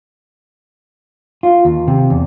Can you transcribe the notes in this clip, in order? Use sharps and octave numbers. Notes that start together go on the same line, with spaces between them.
F4
D#2
C3
E2